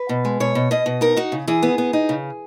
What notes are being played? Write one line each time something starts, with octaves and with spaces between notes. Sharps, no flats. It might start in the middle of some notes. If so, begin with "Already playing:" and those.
Already playing: B4
B2
G#3
B2 C#5
B2
B2 D#5
B2
D#4 A#4
D#4 F#4
C#3
E3 G#4
B3
B3
D#4
C#3